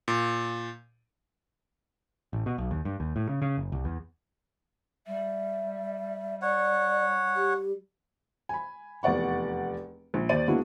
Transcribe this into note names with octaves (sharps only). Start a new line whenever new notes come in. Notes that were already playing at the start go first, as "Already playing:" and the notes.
A#2
A1
B2
B1
D#2
G2
D#2
A2
C#3
C#3
F#1
C2
E2
G3 E5
C#5 D5 F#5
G4
G#5 B5
F1 E2 D5 F#5 C#6
A#1
D#2 C5 D5 D#7
G#3 A#3 B3 D4 E4 F#4